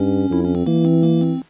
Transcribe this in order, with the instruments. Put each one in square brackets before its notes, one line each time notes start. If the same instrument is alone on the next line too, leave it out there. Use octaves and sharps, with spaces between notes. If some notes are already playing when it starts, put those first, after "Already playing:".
Already playing: [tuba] G2 [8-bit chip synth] C#4
[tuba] F2 [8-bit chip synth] E4
[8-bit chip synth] C#4
C4
[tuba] E3 [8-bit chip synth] A#3
[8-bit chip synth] C4
A#3
C4